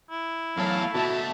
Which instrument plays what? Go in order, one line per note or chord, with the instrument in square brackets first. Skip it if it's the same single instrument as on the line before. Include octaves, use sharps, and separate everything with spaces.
[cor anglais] E4
[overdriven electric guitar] E2 A4 [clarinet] F#3 [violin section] A3 F5
[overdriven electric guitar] B2 A3 [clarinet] F#4 [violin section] E5 A5